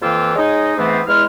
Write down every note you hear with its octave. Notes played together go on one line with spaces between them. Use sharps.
F2 E3 A#3 F4 G5 E6
G#3 D#4 C#5 D#5
G#2 E3 A3 B3 C4
E2 G#3 E4 F6